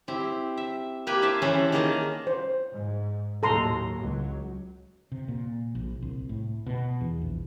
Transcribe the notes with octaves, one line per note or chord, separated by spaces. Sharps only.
C4 E4 G4
E5
A#3 G4 B4 G#5
E4 C5 E5 G#5 A5
E3 C#4 A4 B4 C5
D#3 A#3 G#4 A#4 D#5 A5
C5
G#2
D#2 A2 F#3 A4 A#5 C6
C#2 F#3
C3
A#2
A#1
C2
A2
B2
E2
A#1